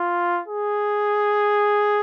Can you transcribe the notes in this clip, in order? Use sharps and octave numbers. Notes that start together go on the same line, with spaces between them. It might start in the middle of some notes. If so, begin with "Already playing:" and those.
Already playing: F4
G#4